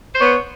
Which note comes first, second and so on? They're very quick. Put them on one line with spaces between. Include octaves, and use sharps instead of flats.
C5 C#5 B3